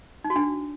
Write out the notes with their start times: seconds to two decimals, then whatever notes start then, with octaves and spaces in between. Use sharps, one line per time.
0.24 D#4
0.30 F#4
0.36 D4